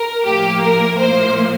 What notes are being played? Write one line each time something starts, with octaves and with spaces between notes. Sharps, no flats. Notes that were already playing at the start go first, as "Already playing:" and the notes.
Already playing: A#4
A2 F3 A#3 G4
A#4
A2 F3 A#3 C5